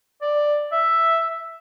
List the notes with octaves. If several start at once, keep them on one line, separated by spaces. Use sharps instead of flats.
D5
E5